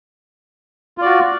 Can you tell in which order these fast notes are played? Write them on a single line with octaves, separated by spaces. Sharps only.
F4 D5 F#4